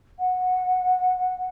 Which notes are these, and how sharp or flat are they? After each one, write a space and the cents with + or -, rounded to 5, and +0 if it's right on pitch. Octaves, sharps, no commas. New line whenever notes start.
F#5 -15